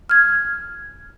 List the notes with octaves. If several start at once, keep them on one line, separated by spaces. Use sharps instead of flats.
F6 G#6